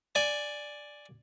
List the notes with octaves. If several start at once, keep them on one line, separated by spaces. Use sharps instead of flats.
D5 G#5